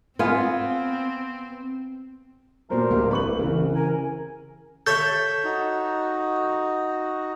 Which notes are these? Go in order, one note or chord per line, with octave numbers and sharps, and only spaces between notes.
B3 C4 F4 G#5
A#2 F#3 A3 A#4 C5
D1 A#3 G4
C2 B4 C#6 F#7
A3
C#3 E3
A#4 G#5
A4 C#5 E5 G6
D#4 F#4